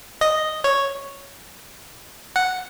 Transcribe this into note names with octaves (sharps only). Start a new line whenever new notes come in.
D#5
C#5
F#5